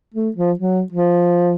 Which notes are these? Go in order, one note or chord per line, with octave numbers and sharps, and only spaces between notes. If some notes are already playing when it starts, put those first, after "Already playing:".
A3
F3
F#3
F3